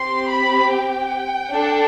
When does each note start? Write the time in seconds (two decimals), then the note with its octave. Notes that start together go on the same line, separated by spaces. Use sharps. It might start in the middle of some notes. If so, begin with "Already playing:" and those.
Already playing: C4 G4 C6
0.29 B5
0.71 G5
1.54 D4 A4